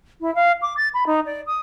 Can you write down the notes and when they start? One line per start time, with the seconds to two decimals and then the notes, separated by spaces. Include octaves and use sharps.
0.20 E4
0.35 F5
0.62 D6
0.77 A6
0.94 B5
1.06 D#4
1.26 D5
1.46 D#6